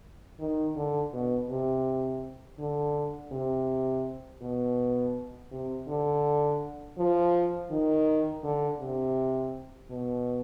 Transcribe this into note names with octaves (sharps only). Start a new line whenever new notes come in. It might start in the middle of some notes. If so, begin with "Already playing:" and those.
D#3
D3
B2
C3
D3
C3
B2
C3
D3
F3
D#3
D3
C3
B2